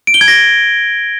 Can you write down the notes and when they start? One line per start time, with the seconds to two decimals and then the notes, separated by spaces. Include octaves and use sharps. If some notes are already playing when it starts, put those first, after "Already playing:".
0.07 D7
0.14 G7
0.21 G#6
0.28 A#6